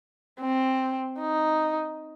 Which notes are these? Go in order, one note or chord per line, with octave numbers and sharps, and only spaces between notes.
C4
D#4